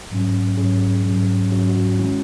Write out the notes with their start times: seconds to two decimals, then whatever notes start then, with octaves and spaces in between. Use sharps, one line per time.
0.11 G#2 F#3 C#4
0.57 G#2 F#3 C#4 G#4
1.04 G#2 F#3 C#4
1.52 G#2 F#3 C#4 F#4
1.69 F#4
1.98 D#3 G#3 C#4 E4